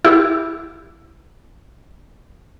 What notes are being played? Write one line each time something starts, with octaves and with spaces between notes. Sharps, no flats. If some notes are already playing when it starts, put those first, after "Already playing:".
E4 G4